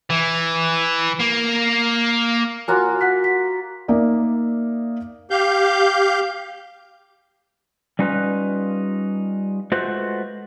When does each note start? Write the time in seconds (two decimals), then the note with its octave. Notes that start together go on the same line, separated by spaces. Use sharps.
0.10 E3
1.19 A#3
2.68 A#3 F4 F#4 G#5 F6 F#6
3.01 F#5 F#6 B6
3.24 B6
3.88 A#3 D#4 A#4 D5 E5
5.30 G4 F5 G6
7.99 G3 C#4 D#4 F4 B4
9.72 G#3 A3 F4 F#4 B4 C5